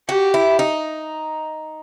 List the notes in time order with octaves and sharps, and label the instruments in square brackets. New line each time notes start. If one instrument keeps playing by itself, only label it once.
[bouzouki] F#4 [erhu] G4
[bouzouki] E4
D#4